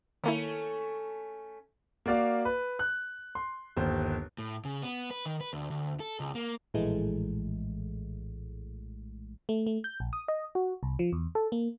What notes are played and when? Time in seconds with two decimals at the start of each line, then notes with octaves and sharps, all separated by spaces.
0.24 D#3 A3 A#3 C#4 E4 A4
2.06 A#3 F#4 D5 F5
2.45 B4
2.79 F#6
3.35 C6
3.77 G1 D#2 C5
4.38 A2
4.65 C#3
4.82 B3
5.11 B4
5.26 D#3
5.41 B4
5.53 D2
5.70 D2
6.00 A4
6.20 C#2
6.35 A#3
6.74 A#1 A2 E3 G#3 A3
9.49 A3
9.67 A3
9.84 G6
10.00 A#1
10.13 D#6
10.28 D#5
10.55 F#4
10.83 C2
10.99 F3
11.12 E2
11.35 A4
11.52 A#3